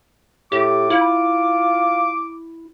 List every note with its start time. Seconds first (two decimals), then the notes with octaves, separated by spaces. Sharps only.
0.52 A2 G4 D6
0.90 E4 F4